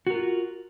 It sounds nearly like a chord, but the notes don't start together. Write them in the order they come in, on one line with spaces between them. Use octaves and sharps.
F#4 A#4 F4